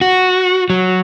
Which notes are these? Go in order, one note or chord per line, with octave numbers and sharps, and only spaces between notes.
F#4
F#3